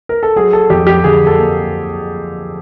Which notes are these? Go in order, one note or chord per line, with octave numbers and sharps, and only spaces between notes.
A#4
A4
F#3 G#4
A4
F2 G4
G4
D3 G#4
A4
A#3